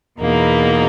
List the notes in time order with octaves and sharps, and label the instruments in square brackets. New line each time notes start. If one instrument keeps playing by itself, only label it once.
[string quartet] E2 B2 A#3 D#4